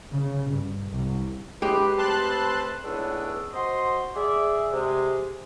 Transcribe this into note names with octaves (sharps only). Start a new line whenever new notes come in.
C#3
G2
C2
F#3 G#3 G4 B4
A3 C4 B4 A5 C6 F#6
C#2 A2 B3 C#4 D4 E6
F#4 C5 D#5 C6
G#4 D5 E5
C3 G#3